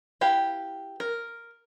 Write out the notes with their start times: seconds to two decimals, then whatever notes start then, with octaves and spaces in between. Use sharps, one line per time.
0.21 E4 G4 B4 F5
1.00 A#4